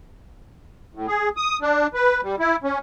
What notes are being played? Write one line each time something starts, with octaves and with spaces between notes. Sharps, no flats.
A2
G#4
D#6
D4
B4
G3
E4
C#4